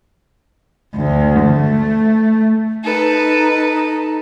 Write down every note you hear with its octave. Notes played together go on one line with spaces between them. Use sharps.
D2
A3
D#4 A4 B4